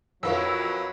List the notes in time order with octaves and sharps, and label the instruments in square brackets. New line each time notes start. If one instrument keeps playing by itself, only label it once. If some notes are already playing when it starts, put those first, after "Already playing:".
[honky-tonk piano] F2 B4 C#5 [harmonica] F#3 [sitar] A#3 E4 [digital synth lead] E6